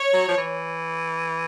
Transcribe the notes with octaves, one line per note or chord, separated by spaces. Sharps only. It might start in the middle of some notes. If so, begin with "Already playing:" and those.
Already playing: C#5
F#3
F3
E3